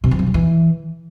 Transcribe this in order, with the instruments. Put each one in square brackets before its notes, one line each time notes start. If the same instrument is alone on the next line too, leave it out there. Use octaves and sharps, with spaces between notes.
[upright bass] C3
E3
F3
F#3
E3